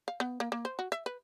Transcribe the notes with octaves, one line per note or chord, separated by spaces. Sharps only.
F5
B3
A#3
A#3
C5
F#4
E5
B4